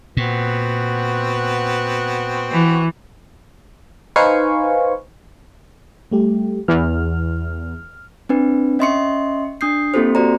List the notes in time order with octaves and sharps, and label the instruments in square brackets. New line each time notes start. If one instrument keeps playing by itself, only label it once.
[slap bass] A#2 [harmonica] B3 C4 F#4
[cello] E3
[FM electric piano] D#4 B4 C5 F5 G#5 C#6
G3 A3 G4
[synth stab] E2 [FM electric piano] F6
[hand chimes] C4 D4 B4
C#4 D#5 E5 C6 C#6 C#7
D4 D#6 G6 C7
A#3 C4 F4 G4 A4 C5
F#4 C5 D5 A#5